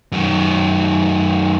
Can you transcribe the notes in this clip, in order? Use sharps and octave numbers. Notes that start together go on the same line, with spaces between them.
F#2 D#3